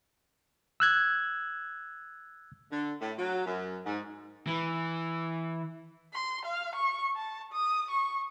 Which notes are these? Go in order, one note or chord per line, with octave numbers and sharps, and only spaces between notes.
E6 F#6 G#6
D3
A2
F#3
F#2
G#2
E3
C6
F5
C#6
A5
D#6
C#6